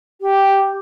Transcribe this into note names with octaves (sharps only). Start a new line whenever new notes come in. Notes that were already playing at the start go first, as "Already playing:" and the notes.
G4